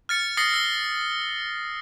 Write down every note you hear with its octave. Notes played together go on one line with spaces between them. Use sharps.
F6 A6 C#7
D#6 A6 A#6 C7 C#7 G7
E6 G7